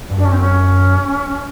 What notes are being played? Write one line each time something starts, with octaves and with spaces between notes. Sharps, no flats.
G2
F#2 D4
C#4
C4
C#4